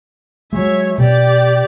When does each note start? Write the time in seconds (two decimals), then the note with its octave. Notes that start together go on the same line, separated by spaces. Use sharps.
0.53 F#3 G#3 C#5 E5
0.98 B2 G4 D5